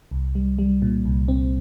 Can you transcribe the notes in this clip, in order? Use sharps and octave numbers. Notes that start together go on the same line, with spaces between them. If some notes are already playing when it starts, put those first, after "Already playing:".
C2
G3
G3
A#2
C2
C4